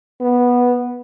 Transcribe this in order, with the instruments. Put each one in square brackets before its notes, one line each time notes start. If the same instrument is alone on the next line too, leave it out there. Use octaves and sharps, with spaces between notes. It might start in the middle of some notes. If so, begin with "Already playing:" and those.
[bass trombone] B3